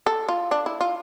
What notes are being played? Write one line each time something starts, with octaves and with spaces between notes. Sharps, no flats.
A4
F4
D4
E4
F4